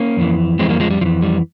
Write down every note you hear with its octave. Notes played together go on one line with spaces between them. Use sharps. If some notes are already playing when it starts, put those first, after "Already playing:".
Already playing: A#3 C#4
F2 E3
F2 E3 G#3 C4
G3 A#3
F3 G#3
G3
F2 E3 F3
G3